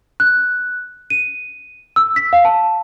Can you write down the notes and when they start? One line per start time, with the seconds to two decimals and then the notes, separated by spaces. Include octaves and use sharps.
0.20 F#6
1.10 D#7
1.96 E6
2.16 B6
2.33 F5
2.45 A5